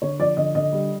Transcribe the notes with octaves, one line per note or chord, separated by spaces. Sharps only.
D3 C#5
F3 D5
D3 D#5
D3 D#5
G3